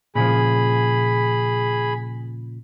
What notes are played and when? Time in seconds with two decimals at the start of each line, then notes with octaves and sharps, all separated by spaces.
0.15 A#2 C#3 F3 G#4 B5